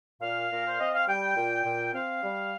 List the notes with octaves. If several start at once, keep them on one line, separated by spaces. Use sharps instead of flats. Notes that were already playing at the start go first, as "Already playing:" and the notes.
A#2 F5
A#2 A#4
C5
C4 D#5
F5
G3 G5
A#2
A#2
C4 F5
G3